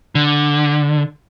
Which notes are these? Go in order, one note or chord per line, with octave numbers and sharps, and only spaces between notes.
D3